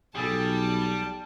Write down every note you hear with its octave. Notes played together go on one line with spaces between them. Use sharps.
B1 G3 G#4 A4 A5